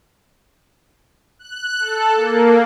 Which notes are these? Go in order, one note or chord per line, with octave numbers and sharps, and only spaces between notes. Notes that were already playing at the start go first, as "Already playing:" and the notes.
F#6
A4
A#3